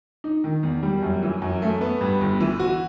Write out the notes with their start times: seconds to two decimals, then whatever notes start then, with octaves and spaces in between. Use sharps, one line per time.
0.24 D#4
0.44 D#3
0.63 E2
0.83 G3
1.03 F#2
1.23 E3
1.42 F#2
1.62 A3
1.81 B3
2.01 G2
2.21 G1
2.40 E3
2.60 F#4